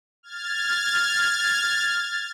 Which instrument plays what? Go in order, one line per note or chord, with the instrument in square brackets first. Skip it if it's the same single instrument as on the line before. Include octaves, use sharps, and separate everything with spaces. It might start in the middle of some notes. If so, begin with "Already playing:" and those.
[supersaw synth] F6 G#6 A6